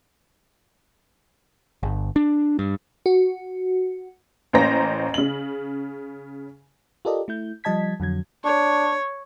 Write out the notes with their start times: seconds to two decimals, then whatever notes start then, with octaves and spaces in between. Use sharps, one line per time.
1.83 G1
2.16 D4
2.59 G2
3.06 F#4
4.53 A1 A#3 C#4 C5 A#5 A#6
5.14 C#3 F#7
7.05 F4 G4 A4 A#4 D5 D#5
7.28 A3 E4 G6
7.64 F3 G3 D#5 A5 G#6 B6
8.00 F2 D3 F#3 G#6
8.45 D4 C#5